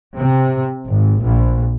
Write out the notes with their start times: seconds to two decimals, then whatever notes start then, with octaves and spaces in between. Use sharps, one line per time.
0.16 C3
0.86 G#1
1.22 A#1